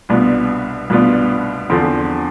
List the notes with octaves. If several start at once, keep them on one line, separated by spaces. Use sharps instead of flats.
C2 B2 B3 D4 F4
C2 B2 B3 D4 F4
E2 D3 F3 C4